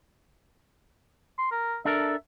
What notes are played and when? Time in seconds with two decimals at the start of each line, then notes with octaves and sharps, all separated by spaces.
1.38 C6
1.51 A#4
1.85 D4 A4 A#4 E5